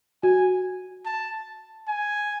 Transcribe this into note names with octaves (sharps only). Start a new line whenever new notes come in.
F#4 G#5
A5
G#5